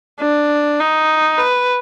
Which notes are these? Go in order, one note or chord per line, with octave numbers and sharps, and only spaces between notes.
D4
D#4
B4